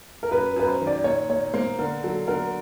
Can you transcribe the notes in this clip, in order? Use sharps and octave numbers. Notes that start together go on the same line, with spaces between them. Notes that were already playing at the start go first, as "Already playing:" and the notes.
A#4
F#2 B4
F#2 B4
C5
D#3
D5
A#2 C#5
A#2 C#5
A#3 C5
D3 A#4
F#3 A4
D3 A#4